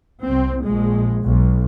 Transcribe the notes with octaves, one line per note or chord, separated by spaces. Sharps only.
C2 C4
A#1 G#3
B1